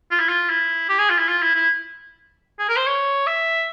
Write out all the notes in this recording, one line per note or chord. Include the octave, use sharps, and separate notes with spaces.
F4
E4
F4
E4
G4
G#4
F4
E4
F4
E4
E4
G#4
A#4
C5
C#5
E5